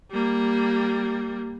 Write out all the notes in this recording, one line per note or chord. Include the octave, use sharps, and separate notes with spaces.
G3 A#3